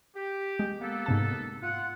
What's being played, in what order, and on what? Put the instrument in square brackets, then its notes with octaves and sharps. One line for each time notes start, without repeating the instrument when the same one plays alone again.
[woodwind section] G4
[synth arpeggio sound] G#3
[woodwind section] A#3 B3 A4
[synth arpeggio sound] G#2 C3 A5
[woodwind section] F4 F#5